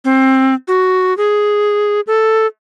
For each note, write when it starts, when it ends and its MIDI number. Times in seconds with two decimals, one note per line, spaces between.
0.05 0.54 60
0.68 1.16 66
1.17 2.01 68
2.07 2.47 69